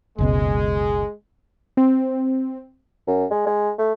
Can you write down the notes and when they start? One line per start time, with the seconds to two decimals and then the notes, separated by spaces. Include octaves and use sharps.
0.18 F#1 C#2 B2 G#3
1.77 C4
3.08 F#2
3.31 G#3
3.46 G#3
3.78 A3